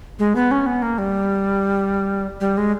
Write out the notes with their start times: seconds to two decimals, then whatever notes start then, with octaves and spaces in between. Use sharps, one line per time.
0.19 G#3
0.35 B3
0.51 C#4
0.66 B3
0.82 A#3
0.98 G3
2.41 G3
2.58 G#3